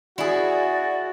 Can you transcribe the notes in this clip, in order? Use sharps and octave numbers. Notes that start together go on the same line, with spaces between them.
E4 F#4 G#4 D5